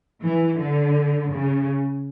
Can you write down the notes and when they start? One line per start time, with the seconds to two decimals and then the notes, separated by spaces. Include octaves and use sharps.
0.22 E3
0.59 D3
1.32 C#3